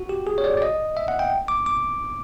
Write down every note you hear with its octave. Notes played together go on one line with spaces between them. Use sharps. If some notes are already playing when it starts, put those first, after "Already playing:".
Already playing: F#4
G4
G#4
C#5
D5
D5
D#5
E5
F#5
G5
D6
D6